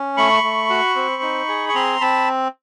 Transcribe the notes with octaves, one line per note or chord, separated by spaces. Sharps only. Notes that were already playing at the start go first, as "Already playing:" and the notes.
Already playing: C#4
A3 B5 C#6
A3
F#4
C4
D#4
G#4
C#6
C4 A#5 C6
C4 A5 B5